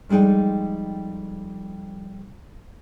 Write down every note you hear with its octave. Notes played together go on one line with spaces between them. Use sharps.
F2 G3 G#3 D#4 G5